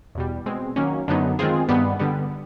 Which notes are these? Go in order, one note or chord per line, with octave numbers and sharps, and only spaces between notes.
E2 B2 G3
B2 G#3 C4
D#3 F#3 A#3 C#4
F#2 D3 F#3 B3 D#4
D#3 G#3 C4 F4 G#4
G2 D#3 G3 B3
D3 G3 B3